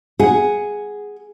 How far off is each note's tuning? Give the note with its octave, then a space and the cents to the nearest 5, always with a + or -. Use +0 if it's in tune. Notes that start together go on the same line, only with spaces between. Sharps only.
G#4 +0 F#5 +0